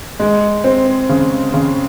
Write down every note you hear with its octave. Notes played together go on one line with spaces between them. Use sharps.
G#3
C4
C#3
C#3